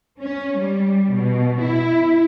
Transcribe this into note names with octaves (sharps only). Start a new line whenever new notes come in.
C#4
G3
B2
E4